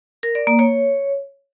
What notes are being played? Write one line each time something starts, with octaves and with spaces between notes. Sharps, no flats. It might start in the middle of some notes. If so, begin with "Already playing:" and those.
A#4
D5
A#3
C#5